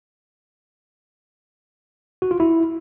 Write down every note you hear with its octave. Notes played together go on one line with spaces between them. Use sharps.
F#4
F4
E4